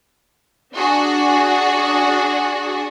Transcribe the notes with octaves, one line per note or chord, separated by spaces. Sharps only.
D4 F#4 G#4